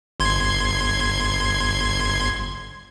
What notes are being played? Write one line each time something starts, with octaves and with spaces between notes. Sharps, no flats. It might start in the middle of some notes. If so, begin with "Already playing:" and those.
G1 C6 G#6